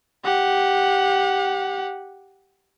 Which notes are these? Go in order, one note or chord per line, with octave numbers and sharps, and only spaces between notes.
G4 F#5